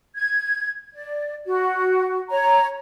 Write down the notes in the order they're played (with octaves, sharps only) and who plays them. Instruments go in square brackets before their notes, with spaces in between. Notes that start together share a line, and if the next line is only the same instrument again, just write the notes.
[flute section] G#6
D5
F#4
C#5 A#5